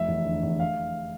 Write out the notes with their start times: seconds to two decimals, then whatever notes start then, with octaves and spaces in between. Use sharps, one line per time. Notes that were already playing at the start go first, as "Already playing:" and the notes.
Already playing: F1 E5
0.08 E2
0.26 D3
0.43 E2
0.60 F5